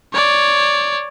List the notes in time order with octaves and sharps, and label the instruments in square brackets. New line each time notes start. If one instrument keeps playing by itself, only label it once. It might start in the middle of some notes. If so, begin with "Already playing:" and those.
[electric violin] C#5 D5